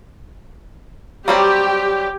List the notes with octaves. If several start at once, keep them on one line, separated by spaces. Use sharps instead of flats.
F#3 G3 C4 G4